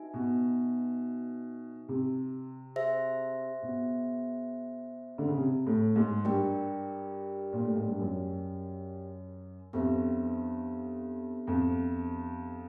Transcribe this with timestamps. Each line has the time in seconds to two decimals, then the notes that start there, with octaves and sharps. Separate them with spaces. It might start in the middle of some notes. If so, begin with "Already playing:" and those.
Already playing: D#4 F#4 B4 E5 G#5
0.14 B2
1.88 C3
2.76 G#4 C5 E5
3.63 B2
5.18 D3
5.28 C#3
5.37 C3
5.67 A2
5.96 G#2
6.25 G2 G4 A#4 D5 G5
7.53 A#2
7.64 A2
7.76 G#2
7.88 G2
7.99 F#2
9.73 F2 B3 D4 G4 C5 E5
11.47 F2